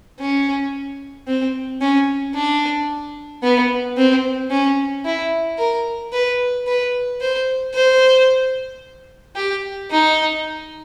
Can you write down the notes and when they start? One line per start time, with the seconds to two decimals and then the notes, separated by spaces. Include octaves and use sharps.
0.20 C#4
1.28 C4
1.81 C#4
2.35 D4
3.43 B3
3.97 C4
4.51 C#4
5.05 E4
5.59 A#4
6.13 B4
6.67 B4
7.21 C5
7.74 C5
9.36 G4
9.91 D#4